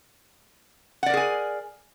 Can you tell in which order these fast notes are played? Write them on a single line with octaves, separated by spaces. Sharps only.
F#5 D5 A#4 G#4 G#5